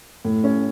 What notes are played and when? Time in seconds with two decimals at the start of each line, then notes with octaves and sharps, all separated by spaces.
0.25 A2
0.44 C#4